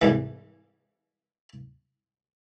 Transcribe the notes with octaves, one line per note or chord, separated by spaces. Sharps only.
C2 G#2 E3